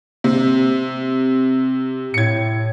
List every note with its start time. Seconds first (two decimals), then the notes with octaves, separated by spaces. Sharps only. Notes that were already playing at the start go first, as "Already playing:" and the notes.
0.24 C3
2.14 A2 G#6 C#7